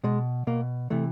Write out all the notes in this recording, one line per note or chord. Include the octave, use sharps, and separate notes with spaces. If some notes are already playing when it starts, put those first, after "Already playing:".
B2 G#3
B2 A#3
C3 E3 A3